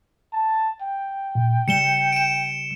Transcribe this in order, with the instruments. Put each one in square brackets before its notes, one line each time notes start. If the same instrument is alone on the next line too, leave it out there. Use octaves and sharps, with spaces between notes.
[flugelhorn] A5
G5
[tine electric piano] A#2
[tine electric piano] C#3 G3 [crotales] C#7 E7 G7
[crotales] D7 E7